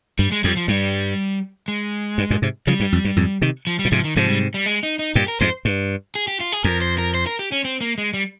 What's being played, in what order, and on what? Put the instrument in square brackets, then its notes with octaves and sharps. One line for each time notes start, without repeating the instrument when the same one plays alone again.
[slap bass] G2 [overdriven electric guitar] G3
[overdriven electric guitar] G#3
[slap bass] F2 [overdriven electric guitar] G3
[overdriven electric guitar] F3
[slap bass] G2 [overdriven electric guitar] G3
[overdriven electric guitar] G#3
[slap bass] G2
G2 A#2
G#2 C3
[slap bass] C#3 F3 [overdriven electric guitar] G3
[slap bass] G2
F2
G2
F2 G#2
C3 D#3
[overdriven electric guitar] F3
G3
[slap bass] A#2
[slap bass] G#2 C3 [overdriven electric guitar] F3
[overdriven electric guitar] D#3
[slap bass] G#2 C3 [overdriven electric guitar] F3
[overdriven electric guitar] G3
G3
G#3
D#4
D#4
[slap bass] G2 A#2 [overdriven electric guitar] G4
[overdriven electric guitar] A#4
[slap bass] F2 G#2 [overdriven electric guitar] C5
[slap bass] G2
[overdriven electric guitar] G#4
G4
F4
G#4
[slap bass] F2 [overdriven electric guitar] A#4
[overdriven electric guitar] C5
A#4
C5
A#4
G4
C#4
C4
A#3
G#3
G3